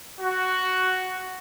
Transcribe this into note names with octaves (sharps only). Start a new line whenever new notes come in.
F#4